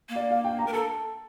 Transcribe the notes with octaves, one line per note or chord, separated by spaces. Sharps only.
A#3
D5
F5
G5
A#5
A#4
A4 A5